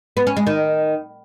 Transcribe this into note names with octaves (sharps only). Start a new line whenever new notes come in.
B3
C#4
G#3
D#3